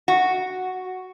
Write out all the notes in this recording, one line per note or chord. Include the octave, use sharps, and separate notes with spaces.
F#4